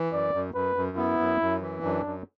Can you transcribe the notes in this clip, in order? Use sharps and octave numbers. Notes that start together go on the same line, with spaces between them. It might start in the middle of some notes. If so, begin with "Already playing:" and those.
Already playing: E3
F#2 D5
F#2
F#2 B4
F#2
B3 E4
F#2
F#2
E3
F#2 D4
F#2